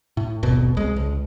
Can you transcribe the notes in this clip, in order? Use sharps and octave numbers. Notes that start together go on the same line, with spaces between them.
A2
D#1 G#1 B2
C2 G#3
C#2